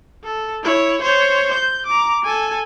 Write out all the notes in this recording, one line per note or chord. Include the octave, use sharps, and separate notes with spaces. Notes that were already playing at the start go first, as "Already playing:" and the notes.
A4
E4 C#5
C5 C#5
G6
A#5 D6
A4 G#5